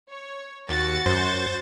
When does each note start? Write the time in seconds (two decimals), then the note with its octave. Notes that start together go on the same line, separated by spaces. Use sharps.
0.10 C#5
0.69 D#2 F#4 A6 C#7
1.06 F#2 C5